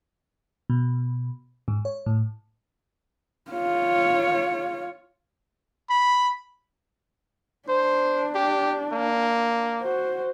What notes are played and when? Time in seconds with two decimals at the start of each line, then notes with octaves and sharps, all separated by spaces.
0.70 B2
1.68 G#2
1.85 C#5
2.06 A2
3.51 F4 C#5
5.90 B5
7.69 D4 C5
8.35 G4
8.93 A#3
9.81 F#4 C5